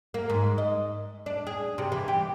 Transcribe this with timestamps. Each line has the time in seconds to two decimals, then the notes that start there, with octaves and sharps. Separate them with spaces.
0.14 A#3
0.30 G#2
0.58 D#5
1.26 D4
1.47 G#4
1.78 C3
1.92 E3
2.08 G4